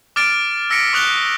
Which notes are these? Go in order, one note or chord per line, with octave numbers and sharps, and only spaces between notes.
D6 F6 A6 D7
E6 A#6 B6 C#7 D7
C#6 D#6 F#6 F7 G7